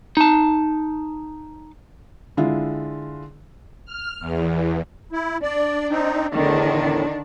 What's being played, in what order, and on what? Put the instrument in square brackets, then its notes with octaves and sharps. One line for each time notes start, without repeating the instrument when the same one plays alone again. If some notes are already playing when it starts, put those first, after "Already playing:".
[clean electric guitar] D#4 A5
[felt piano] D3 G#3 E4 F4
[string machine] F6
E2
[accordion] E4
[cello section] D4 [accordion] D5
[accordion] C4 D#4
[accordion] E2 A2 [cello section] D3 D#3 D4